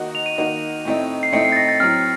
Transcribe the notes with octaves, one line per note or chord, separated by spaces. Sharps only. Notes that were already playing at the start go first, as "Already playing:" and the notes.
Already playing: D#3 A#3 D#4 F#4
F7
D#7
D#3 A#3 D#4 F#4
A2 A3 C4 D#4
C7
A2 A3 C4 D#4 C#7
C7
A6
A#6
A6
A2 F#3 C4 F6